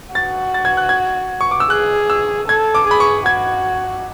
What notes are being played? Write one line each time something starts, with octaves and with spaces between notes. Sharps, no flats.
F#4 A6
A6
G#6
F#6
G#6
C#6
D6
E6
G#4 F#6
E6
A4 G#6
D6
G#4 B5
C#6
F#4 G#6